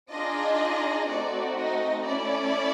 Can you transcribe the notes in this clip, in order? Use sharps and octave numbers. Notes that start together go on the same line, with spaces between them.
D4 D#4 F4 G#4 D#5
A3 C4 D#4 F#4 D5
D#4 D#5
A3 C#4 E4 D5